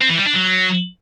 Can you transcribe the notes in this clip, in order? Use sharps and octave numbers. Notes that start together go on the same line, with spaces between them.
C4
E3
G3
D4
F#3